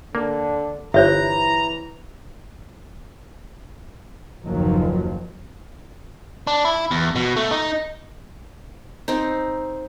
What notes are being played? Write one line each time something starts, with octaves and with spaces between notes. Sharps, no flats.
D3 A#3
G1 E3 C5 C#5 E5 A#5
F#1 D#2 D#3 F3 F#3
D4
E4
E2
B2
A3
D#4
C4 D#4